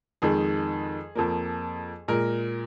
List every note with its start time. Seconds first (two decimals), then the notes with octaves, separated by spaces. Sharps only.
0.22 F2 D#3 G#3 G#4
1.15 F2 F3 A#3
2.08 A#2 G#3 A#4